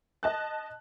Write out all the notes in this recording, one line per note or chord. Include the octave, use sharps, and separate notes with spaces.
D#5 A5 F#6